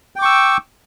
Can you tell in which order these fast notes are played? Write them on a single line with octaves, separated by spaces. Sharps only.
G5 D6 C#6 E6